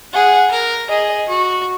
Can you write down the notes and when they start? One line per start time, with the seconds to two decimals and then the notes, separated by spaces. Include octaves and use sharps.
0.13 G#4 F#5
0.51 A#4
0.90 G#4 D#5
1.28 F#4